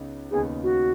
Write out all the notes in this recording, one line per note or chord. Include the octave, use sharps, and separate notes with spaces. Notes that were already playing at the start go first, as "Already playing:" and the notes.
Already playing: C#2 C#3 B3 D#4
D#2 C#3 B3 D#4 G#4
F#4